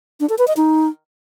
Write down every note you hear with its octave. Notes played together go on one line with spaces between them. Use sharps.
D4
A4
B4
D#5
D#4